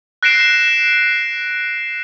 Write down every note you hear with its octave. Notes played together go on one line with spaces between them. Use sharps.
F#6 A#6 C7 D7 E7